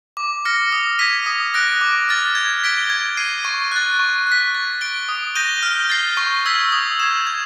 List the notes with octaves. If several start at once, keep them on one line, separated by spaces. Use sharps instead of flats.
D6
F6 A#6 C#7
D#6
G#6 B6 D#7
D#6
F#6 A#6 D7
D6
F6 A6
G#6
B6 D7 G7
G#6
C7 D#7
C#6
F#6 A6
C#6
F#6 B6
A6
D7 G7
D#6
G6 A#6 D#7 G7
F6
A6 C7
C#6
E6 G#6 B6
D#6
G#6 C7 E7
G#6